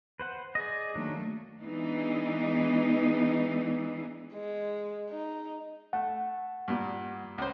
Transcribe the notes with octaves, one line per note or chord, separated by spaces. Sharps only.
B4 C5 F#5
G#4 D5 D#5
D#3 F#3 A3 A#3 D4
E3 G#3 B3 D4 D#4
G#3
D#4
A3 F#5
G2 A#2
C#2 C5